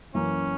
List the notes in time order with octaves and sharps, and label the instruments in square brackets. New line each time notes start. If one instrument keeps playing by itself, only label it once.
[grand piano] F#2 E3 A#3 [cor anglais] C#4